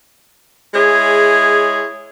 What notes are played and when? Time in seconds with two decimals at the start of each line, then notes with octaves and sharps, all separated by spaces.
0.74 G#3 E4 G#4 C#5